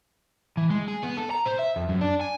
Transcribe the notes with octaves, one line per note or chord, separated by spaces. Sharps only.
E3
G#3
G#4
B3
A4
A#5
C5
E5
F2
F#2
D4
G#5